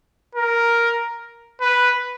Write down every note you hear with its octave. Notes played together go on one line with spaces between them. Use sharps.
A#4
B4